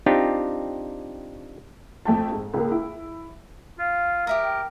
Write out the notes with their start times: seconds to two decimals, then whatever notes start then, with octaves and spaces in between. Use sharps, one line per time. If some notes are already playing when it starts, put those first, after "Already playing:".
0.06 C4 D4 D#4 F4 G4
2.05 F2 A3 G5 A5
2.32 G#2
2.54 C#2 A#3
2.71 E4
3.79 F4 F5
4.27 G4 A#4 E5 D#6
4.44 G5